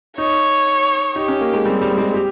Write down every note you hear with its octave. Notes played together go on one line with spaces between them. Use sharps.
D#4 C#5
D#4 G4
C#4
A#3
G#3
G3 C4
G3
G#3
G4